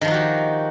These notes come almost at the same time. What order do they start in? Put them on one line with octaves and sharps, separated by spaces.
D#3 F3 D#4 F#4 G4